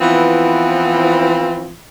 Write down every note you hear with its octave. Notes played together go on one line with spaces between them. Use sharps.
E3 F3 B3 C4 E4 F4